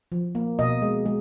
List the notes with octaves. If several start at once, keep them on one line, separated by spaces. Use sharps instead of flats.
F3
A#3
B2 D#5
G#3
G#3